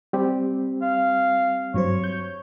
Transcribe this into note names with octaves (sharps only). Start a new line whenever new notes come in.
G3 C4 G4
F5
G2 F#3 C5 C#5
G6